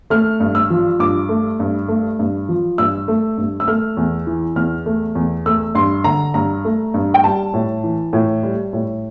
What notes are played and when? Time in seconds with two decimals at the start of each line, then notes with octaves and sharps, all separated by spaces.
0.10 A3 F6
0.40 G2
0.55 E6
0.70 F3
1.00 G2 D6
1.29 A3
1.60 G2
1.88 A3
2.19 G2
2.49 F3
2.78 G2 E6
3.08 A3
3.38 G2
3.60 E6
3.68 A3 F6
3.97 E2
4.27 E3
4.56 E2 F6
4.86 A3
5.15 E2
5.46 A3 E6
5.75 G2 C6
6.04 D3 A#5
6.34 G2 A#5
6.65 A3
6.94 G2
7.14 G5
7.24 G3 A5
7.54 A2
7.84 E3
8.13 A2
8.43 G3
8.73 A2